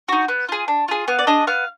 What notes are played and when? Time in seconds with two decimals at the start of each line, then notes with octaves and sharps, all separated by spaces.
0.08 D#4 F#4
0.28 B3
0.49 F4 G#4
0.68 D4
0.88 F4 G#4
1.08 B3 F5
1.19 D5
1.27 D4 G#4 D#5
1.47 B3 F5